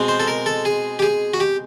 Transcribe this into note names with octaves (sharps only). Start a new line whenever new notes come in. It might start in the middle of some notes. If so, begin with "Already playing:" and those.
Already playing: B2 G#3 C4
C5
A4
A#4
A4
G#4
G4
G#4
F#4
G4